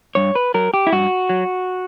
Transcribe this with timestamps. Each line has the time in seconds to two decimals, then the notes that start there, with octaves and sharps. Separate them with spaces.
0.15 G2 C#5
0.35 B4
0.54 F#3 A#4
0.74 G4
0.87 E4
0.92 G2 F#4
1.29 F#3